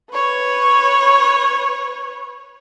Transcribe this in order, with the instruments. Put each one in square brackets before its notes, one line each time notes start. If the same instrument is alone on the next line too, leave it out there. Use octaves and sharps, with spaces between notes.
[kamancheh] B4 C#5